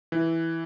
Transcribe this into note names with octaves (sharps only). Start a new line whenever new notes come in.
E3